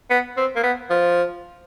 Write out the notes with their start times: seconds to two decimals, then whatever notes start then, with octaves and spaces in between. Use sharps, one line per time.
0.10 B3
0.37 C4
0.56 A#3
0.63 B3
0.90 F3